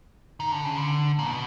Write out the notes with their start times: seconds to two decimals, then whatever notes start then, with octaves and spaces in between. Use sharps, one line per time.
0.40 D#3
0.52 D3
0.65 C#3
0.76 D3
1.19 A#2
1.25 B2